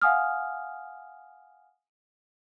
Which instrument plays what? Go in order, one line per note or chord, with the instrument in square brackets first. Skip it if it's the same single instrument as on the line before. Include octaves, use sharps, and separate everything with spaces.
[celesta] F5 F#5 G#5 D#6 F6